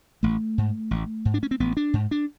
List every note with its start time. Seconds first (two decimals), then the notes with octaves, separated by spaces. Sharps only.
0.23 A1 A3
0.58 G#2
0.91 A1
1.25 G#2
1.34 D4
1.43 C#4
1.51 C4
1.60 A1 B3
1.77 D4
1.93 G#2
2.11 D4